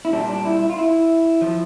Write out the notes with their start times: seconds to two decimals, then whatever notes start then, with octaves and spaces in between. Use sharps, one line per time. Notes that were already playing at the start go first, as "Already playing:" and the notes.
0.05 E4
0.13 A#2 G3 D4
0.29 D4
0.45 E4
0.61 E4
0.70 F4
0.77 E4
1.42 F3